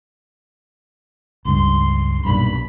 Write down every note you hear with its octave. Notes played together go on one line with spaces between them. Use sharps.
C#2 G2 C6
B1 G2 A#2 B5